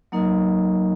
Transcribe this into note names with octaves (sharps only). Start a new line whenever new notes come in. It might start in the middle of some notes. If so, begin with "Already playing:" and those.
F#3 A#3 D#4 A#4 D#5